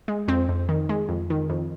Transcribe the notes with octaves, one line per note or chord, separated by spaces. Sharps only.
G#3
F2 C4
F2
D#3
G#3
F2
D#3
F2